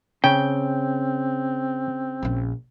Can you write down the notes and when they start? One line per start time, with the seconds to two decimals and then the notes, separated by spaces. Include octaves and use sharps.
0.24 C#3 C4 G5
2.23 A#1 C#4